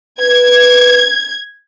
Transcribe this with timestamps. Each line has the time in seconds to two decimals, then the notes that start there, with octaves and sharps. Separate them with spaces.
0.20 B4 G#6